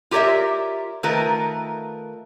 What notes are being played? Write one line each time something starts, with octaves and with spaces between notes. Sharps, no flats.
F4 G4 A#4 C#5 D5 E5
D#3 A3 F4 A#4 B4